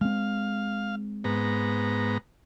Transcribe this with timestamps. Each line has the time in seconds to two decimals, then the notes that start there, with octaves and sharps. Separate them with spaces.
0.01 G#3 C4 F5
1.24 G#2 B3 A#5